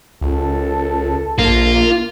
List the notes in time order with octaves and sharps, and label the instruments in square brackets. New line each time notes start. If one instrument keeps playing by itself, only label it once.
[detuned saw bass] C#2 [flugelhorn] A4
[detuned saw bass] A#1 [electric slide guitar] A#3 [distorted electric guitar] F4